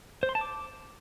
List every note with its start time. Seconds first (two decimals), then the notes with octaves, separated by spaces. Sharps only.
0.23 C5
0.29 C6
0.35 A5
0.41 D6